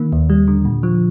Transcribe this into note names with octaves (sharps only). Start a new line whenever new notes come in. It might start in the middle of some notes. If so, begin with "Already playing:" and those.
Already playing: D#3 A#3
D#2
G3
D3
A#2
F3